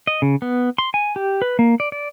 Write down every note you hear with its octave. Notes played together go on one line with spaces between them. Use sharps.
D#5
C#3
B3
C6
G#5
G4
B4
A#3
D5
D5